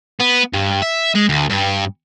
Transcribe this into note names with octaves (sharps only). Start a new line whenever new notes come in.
B3
G2
E5
G#3
D2
G2